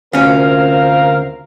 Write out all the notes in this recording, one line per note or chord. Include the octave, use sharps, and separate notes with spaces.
D2 C4 C#4 F4 A#4 F5